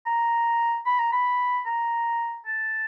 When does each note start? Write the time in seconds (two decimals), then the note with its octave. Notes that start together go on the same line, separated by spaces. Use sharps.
0.06 A#5
0.86 B5
0.99 A#5
1.12 B5
1.66 A#5
2.46 A5